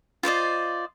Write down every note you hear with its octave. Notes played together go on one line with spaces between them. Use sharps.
F4 C5 D5 D#5